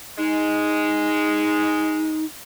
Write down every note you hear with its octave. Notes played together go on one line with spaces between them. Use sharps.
G#3 D#4